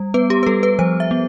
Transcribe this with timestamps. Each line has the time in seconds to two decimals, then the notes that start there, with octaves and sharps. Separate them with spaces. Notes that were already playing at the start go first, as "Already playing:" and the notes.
Already playing: G3
0.14 B3 B4
0.30 G4
0.43 B4
0.47 G3 A4
0.63 B4
0.79 F3 C5
1.00 E5
1.11 B3